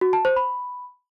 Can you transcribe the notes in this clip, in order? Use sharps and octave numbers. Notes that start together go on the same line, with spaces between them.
F#4
A5
C5
B5